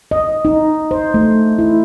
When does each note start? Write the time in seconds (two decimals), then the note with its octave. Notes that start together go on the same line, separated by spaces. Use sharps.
0.11 D#5
0.45 D#4
0.91 C5
1.14 A3
1.59 E4